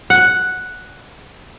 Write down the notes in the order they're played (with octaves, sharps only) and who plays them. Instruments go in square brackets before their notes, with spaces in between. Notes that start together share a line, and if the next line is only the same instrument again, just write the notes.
[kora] F#5